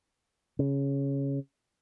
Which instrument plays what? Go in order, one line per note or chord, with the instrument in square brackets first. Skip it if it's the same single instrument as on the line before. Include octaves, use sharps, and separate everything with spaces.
[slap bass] C#3